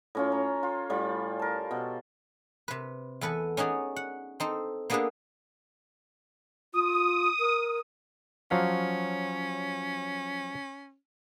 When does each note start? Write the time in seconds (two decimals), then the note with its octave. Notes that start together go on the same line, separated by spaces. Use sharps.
0.15 A2 C#4 F4
0.32 A#5
0.63 F4
0.90 A2 G3 F4 B5
1.39 A#4 A5
1.71 B2
2.68 C3 B4
3.21 E2 A4 B4 F#5 G#5
3.57 C#4 D#4 F#4 G#4 D5
3.96 F#5
4.40 C4 D#4 A4 C5
4.90 A#3 B3 D4 G#4 A4 B4
6.74 F4 D#6
7.40 A#4
8.51 F3 F#3 C#4 F5